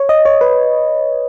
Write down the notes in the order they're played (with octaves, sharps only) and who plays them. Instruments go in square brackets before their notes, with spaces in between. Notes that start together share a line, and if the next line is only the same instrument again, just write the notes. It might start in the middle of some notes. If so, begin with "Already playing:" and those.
Already playing: [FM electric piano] C#5
D#5
C#5
B4